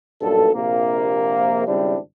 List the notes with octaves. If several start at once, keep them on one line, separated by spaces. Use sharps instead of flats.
B1 G2 A#2 A4
A#1 C3 A#3
G#1 C#3 G3 C4 D4 E4